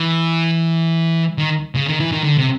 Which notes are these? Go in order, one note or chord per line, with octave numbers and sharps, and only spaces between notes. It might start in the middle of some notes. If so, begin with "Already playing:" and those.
Already playing: E3
D#3
C#3
D#3
E3
D#3
D3
C3